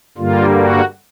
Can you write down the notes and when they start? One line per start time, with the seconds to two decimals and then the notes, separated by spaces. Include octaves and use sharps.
0.18 G2 D3 G3 A#3 F4
0.57 F#4